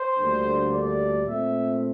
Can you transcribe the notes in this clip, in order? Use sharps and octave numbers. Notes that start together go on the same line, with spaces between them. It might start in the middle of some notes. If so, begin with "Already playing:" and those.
Already playing: C5
D2 D3 G3 A#3 D4
D5
A#2 A3 C4 E5